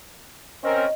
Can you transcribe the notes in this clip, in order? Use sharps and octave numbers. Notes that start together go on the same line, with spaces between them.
C4 C#4 A#4 D#5